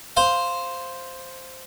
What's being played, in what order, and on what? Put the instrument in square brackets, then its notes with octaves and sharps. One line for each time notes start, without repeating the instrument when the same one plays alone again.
[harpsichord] C5 F5